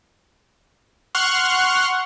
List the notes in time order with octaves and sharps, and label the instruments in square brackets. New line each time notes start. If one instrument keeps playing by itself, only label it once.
[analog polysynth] F#5 C6 C#6 F6 F#6